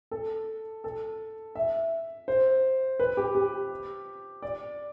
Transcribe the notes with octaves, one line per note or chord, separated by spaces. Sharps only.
A4
A4
E5
C5
B4
G4
G4
D5